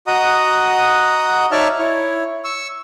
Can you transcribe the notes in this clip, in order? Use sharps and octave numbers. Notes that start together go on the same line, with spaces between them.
F#4 D#5 F#5 A#5 D#6
D#4 C#5 D5 E5 A5 F6
E4 C#5
C#6 E6